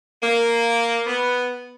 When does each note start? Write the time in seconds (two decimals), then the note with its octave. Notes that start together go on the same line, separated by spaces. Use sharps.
0.23 A#3
1.07 B3